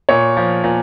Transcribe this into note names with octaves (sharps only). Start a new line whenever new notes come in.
A#2 C#5
F3
A#2